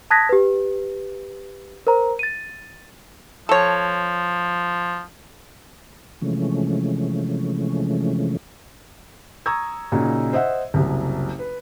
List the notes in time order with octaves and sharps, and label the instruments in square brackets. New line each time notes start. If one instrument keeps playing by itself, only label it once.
[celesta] A5 D#6 F#6 G#6 A#6 B6
G4 B4
A#4 C5 A#5
A6 D#7
[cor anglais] F3 [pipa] A4 C#5
[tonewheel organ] C3 E3 F3 G#3 A3 C#4
[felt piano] A#5 C#6 D#6 E6 G#6
A#2 C#3 D#4 F#4
C5 D#5 E5 F#5
F#1 C2
B4